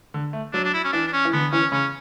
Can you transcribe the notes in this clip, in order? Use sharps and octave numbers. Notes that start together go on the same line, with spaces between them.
D3
A3
F#3 D4
D4
E4
C#4
E3 D4
D4
C#4
E3
D3 B3
E3 C#4
C#3 C#4